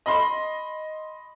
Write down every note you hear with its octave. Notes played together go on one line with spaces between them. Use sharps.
D#5 B5 C6